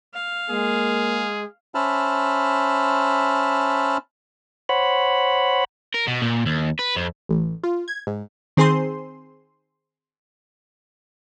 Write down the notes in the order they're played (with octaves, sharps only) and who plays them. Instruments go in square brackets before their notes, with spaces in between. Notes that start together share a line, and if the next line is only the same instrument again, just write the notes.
[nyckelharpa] F5
[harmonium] G#3 [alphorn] A#3 [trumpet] G#4
[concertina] C#4 C5 E5 A5 B5 F6
[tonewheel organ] C5 C#5 F#5 B5
[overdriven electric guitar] A#4
B2
A#2
D#2
B4
F2
[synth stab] A1
F4
G#6
G#2
D#3 C4 G#4 C5 C6